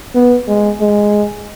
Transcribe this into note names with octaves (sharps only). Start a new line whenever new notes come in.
B3
G#3
G#3